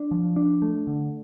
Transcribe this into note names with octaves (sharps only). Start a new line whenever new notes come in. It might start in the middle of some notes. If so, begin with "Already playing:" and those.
Already playing: D4
F3
D4
A3
D3